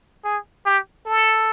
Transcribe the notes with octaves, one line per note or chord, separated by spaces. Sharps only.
G#4
G4
A4